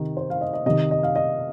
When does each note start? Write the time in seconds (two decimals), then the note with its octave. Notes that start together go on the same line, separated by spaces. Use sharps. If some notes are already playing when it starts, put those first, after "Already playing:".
Already playing: C3 D#3
0.17 C5
0.30 F5
0.41 D#5
0.53 D#5
0.66 C3 D#3 D#5
0.91 D#5
1.03 F5
1.16 D#5